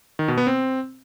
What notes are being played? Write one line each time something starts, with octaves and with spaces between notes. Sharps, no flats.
D#3
B2
B3
C4